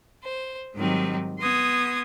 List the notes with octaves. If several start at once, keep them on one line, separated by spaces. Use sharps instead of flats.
C5
G#2 D#3 F#3 G3 C4 D#4
B3 C6 D#6 G#6 A#6